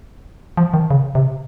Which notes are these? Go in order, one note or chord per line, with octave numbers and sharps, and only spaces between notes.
F3
D#3
C#3
C3